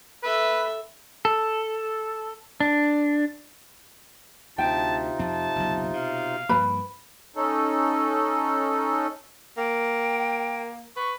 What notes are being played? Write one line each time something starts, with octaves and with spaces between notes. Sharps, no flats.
A4 B4 E5
A4
D4
D2 C3 D#4 F4 G5 A5
F2 C4 A5
F#1 B1
B2 F5
G2 F3 A#3 B4 B5
C#4 D#4 A4
A#3 G5
B4 C#6